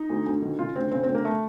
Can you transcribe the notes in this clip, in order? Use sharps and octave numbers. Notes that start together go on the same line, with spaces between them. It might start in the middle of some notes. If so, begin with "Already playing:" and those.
Already playing: D#4
D2
D2
D#3
C#3 F4
D2 C4
C#3 C4
C4
D2
A#3
A3